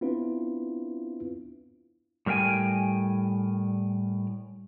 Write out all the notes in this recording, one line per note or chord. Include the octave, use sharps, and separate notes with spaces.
B3 C4 D4 E4 F4 B4
A2 G3 A#4 E5 G5 G#5